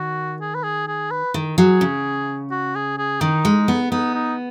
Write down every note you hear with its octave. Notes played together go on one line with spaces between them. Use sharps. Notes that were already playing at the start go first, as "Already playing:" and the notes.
Already playing: D#3 F#4
G#4
B4
G#4
G#4
B4
D#3
F#3 G#4
C#3
F#4
G#4
G#4
D#3 D#4
G#3
B3
B3 D#4
D#4